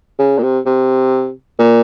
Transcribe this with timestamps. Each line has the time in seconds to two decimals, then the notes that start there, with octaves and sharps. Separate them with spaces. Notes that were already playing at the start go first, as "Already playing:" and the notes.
0.19 C#3
0.38 A#2
0.43 C3
0.66 C3
1.59 A#2